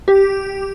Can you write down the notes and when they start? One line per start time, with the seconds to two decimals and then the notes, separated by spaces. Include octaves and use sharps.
0.08 G4